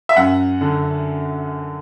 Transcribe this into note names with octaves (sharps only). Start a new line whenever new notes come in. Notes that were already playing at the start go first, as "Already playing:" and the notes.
E5
F#2 F#5
D3